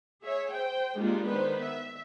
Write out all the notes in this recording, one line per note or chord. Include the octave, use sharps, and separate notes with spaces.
G#4 C#5 E5
C5 G5
G3 G#3 A#3 D4 D#4 F4
D#3 B3 B4 C5
E5